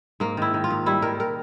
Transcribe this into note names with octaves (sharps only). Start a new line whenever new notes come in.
G#2 A#3
D#3 E4
D#3
F4
G#2
G3 E4
D#3 A#4
A#4